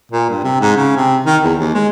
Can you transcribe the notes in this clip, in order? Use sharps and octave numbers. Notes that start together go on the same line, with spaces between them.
A#2
G2
C3
G#2
C#3
C3
D#3
E2
D#2
G#3